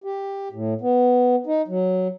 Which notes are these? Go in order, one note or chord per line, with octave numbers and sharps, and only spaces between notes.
G4
A2
B3
D#4
F#3